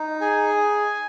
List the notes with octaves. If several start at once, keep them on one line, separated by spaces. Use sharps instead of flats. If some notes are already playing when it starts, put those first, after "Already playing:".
Already playing: D#4
G#4 G#5